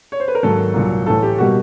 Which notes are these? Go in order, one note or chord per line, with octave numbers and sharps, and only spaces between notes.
C#5
C5
B4
A#4
G#2 D#3 F#3 A#3 A4
C2 A#2 F#3
A2 E3 A3 A4
G4
B2 G3 A#3 F#4